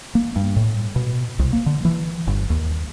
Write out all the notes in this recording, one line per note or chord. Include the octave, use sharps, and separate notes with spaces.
A#3
G2
A2
B2
C2
A#3
D3
E3
G1
D#2